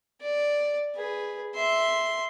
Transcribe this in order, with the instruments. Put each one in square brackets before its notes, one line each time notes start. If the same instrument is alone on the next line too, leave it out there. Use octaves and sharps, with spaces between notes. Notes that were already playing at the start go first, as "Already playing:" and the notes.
[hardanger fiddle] D5
G#4 B4
E5 C6